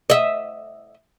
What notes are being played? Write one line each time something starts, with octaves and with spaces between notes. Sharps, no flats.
D#5 E5